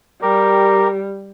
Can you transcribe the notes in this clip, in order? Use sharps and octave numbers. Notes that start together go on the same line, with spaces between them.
G3 G4 A#4